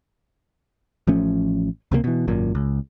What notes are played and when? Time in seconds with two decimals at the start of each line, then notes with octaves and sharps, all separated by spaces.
1.07 A1 F3 A3 C#4
1.91 C#2 C3 F#3 A#3
2.04 B2 E3
2.27 G#1 F#2 A#2
2.55 C#2